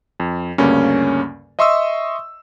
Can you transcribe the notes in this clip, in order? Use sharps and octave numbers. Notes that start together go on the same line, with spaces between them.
F2
D2 G2 C#3 A#3 C#4
D#5 E5 C6 C#6 D#6 E6